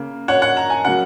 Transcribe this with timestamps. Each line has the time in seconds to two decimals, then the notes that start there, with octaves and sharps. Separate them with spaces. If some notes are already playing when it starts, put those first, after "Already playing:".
Already playing: C#3 A#3
0.28 C#5 F#5
0.42 C#5 F#5
0.57 A#5
0.70 G#5
0.85 C#3 F#3 A#3 F#5